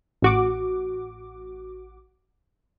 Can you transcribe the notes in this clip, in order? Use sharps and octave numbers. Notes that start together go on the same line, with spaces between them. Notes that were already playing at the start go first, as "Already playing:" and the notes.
A1 F#4 D6